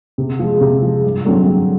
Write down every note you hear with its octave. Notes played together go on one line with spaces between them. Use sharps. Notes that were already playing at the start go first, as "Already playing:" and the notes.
C3
F3 G#3
C3
F3 G#3
G2
D3 F#3 A3 C4
G2